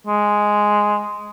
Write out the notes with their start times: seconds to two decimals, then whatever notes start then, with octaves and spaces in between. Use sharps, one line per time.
0.07 G#3